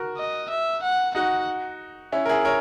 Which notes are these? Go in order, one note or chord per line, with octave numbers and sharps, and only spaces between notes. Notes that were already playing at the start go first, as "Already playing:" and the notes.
Already playing: F#4 A#4
D#5
E5
F#5
D#4 F#4 F#5
C#4 E4
A#4
E4 G#4
A#4 C#5